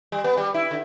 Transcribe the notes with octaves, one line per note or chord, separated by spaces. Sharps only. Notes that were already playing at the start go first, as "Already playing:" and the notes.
G3
B3
G3
E4
D3